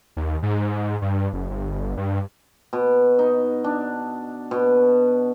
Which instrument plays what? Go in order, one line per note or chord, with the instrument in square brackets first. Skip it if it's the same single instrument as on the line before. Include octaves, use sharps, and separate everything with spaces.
[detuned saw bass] D#2
G#2
G2
F#1
G1
G2
[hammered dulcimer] B2
D#4
D4
B2